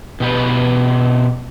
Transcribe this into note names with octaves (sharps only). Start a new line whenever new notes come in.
B2 G4 B4